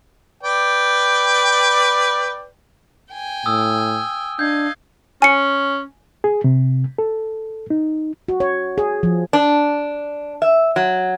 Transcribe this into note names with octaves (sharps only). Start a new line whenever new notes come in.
B4 D5 G5
G5 G#5
A2 D#6 E6
D4 D#5 F5 G6 G#6
C#4 G#5 C#7
G#4
C3
A4
D#4
F#4
C#5
G#4
F3
D4
E5
F#3